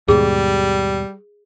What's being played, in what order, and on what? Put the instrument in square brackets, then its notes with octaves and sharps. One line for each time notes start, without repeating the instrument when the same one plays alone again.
[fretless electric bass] D#2 G#2 B2 [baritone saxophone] G3 [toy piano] G#4